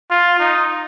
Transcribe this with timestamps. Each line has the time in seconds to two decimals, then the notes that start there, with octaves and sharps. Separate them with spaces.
0.10 F4
0.40 D#4